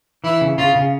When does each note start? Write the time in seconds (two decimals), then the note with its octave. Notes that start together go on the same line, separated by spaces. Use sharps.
0.24 E3 E4
0.41 C#3
0.58 C#3 F4
0.75 C#3